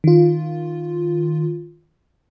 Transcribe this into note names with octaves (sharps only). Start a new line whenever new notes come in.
D#3 F4